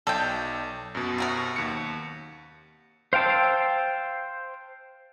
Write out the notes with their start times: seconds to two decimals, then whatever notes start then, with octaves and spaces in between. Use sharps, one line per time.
0.07 B1 A4 D5 G5
0.95 F#2 B2
1.18 C3 F#4 A#4
1.56 D#2 C#7
3.13 C5 F5 G5 A5 E6